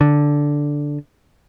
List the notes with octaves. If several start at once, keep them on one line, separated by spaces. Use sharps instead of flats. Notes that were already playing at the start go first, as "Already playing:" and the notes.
D3